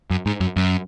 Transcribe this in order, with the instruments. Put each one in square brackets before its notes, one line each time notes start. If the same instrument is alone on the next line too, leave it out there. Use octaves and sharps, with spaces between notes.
[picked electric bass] F#2
G#2
F#2
F#2